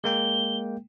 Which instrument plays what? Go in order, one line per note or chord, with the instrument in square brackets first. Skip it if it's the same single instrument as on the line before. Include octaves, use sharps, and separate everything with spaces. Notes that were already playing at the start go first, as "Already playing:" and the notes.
[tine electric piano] G#3 A#3 G5 [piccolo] G7